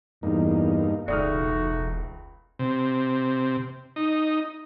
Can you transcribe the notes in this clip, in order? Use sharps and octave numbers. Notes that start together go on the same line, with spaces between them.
E2 G2 A#3 D#4
E1 C#2 A3 D#4 F#4 D5 D#6 F6
C3
D#4